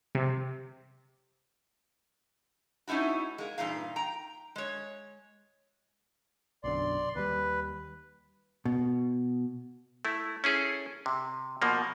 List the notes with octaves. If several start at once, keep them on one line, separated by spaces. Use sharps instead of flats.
C3
A3 C#4 D#4 E4 F#4
G#3 A#3
G2 A#2 E3 D#4 F5
G5 A#5
G#3 C#5
B1 F#2 D3 D5 C6
D#2 G3 B4
B2
A3 E4
C#4 E4 G#4 A4
C3
B2 F3 A#3